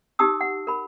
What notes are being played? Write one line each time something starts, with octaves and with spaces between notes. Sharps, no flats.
D#4 G4 A5 D#6 E6
F#5
A#4 B5